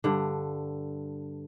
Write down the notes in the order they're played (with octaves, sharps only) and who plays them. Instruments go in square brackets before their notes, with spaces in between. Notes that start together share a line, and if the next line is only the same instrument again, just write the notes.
[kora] G2 D3